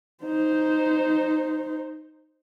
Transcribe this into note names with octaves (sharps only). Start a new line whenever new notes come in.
D#4 C5